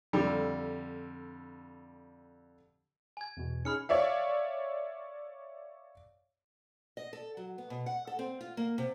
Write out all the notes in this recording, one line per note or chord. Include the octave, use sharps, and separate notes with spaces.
F2 D3 G3
G#5 G#6
E2 B2
C#4 D#4 G#4 B5 F6 C#7
C#5 D5 E5 F5
D#5
A4
F#3
B3
B2
F#5
A4
C4
F4
A#3
C3